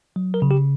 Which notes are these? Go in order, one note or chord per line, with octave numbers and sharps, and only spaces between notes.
F#3
A#4
C#3
G4